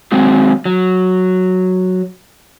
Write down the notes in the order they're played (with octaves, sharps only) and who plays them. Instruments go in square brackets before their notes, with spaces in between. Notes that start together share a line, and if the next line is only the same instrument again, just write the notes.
[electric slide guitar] F#3 G#3 C4
F#3